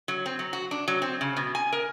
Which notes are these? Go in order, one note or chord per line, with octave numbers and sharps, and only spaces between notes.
F#3
C4
F#3
F#4
D4
F#3
C4
C#3
B2
G#5
A#4